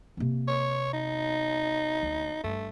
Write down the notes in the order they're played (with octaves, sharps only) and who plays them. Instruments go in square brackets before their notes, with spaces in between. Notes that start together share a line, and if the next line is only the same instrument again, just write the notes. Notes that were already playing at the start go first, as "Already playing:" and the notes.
[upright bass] C3 A#3
[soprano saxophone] C#5
D#4
[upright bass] D2
[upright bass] G2 [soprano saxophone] A3